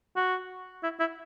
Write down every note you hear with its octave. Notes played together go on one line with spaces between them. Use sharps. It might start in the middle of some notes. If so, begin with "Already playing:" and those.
F#4
E4
E4